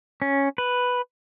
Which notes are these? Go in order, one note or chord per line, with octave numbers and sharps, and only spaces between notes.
C#4
B4